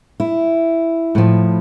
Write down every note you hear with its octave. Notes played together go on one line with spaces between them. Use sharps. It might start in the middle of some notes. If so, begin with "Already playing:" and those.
E4
A2 F3